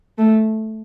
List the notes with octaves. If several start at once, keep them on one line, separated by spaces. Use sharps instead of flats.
A3